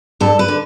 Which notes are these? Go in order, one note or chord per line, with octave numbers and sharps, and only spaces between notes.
G2 A4
B4
D3